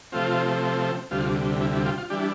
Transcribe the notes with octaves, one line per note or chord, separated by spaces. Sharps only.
C3 F3 A3 C4 F4
D2 C3 G3 F4
E4
E4
F4
F4
E3 G3 D4 G4